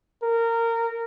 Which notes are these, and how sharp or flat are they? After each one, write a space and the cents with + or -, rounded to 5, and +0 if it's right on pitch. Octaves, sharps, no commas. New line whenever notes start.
A#4 -20